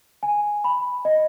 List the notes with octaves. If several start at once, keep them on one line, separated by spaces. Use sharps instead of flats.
G#5
B5
D#5